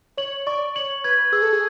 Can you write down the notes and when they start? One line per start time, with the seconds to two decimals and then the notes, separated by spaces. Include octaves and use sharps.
0.17 C#5 F#7
0.47 D5 C#6
0.75 C#5 F#7
1.04 B4 G#6
1.32 G#4 E6
1.42 A4
1.53 G#4